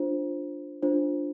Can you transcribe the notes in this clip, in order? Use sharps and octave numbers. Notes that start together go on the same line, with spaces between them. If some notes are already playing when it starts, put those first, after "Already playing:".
Already playing: D4 F4 C5
D4 F4 C5